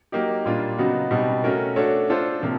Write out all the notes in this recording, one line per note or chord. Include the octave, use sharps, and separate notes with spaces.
F#3 A#3 D#4 G4
A#2 G3 A#3 D4 F4
C#3 F#3 B3 D#4 F#4
B2 G3 C4 D#4
A3 C#4 F#4 A#4
A3 D4 F#4 A4 C#5
A3 D4 F4 A4 C5
C3 F3 A#3